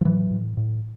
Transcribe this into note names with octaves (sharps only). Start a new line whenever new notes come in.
F3
A2 E3 F#3
A2
A2